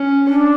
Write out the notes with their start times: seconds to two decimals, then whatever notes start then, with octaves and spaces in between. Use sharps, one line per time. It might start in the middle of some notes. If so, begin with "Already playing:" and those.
Already playing: C#4
0.27 D4